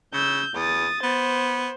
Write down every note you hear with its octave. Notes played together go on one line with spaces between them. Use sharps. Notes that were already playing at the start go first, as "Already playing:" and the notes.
C#3 E6 G6
E2 D#6 A6
B3 C5